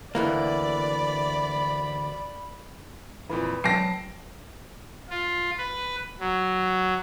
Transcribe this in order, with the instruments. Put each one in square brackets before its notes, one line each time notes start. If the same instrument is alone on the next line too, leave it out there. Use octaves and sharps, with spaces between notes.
[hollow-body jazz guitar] D2 E3 A#3 [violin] D5 [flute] B5
[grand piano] F2 A#2 E3 [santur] B4
[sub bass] F#3 [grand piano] G5 A5 D7 [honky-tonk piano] A#6 C7
[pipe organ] F4
B4
F#3